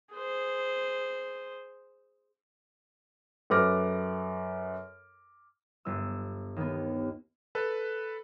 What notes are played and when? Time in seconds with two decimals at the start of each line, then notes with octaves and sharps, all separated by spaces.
0.13 G#4 C5
3.50 F#2 A4 B4 D6 F6 A#6
5.85 G1 E6
6.56 D#2 B3
7.55 A4 B4